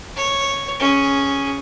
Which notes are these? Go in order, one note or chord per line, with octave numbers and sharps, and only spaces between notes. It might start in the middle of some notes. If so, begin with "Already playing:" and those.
C#5
C#4 G#4